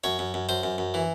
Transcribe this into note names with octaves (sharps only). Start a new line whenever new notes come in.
F#2 C#5
F#2
F#2
F#2 C5
F#2
F#2
E3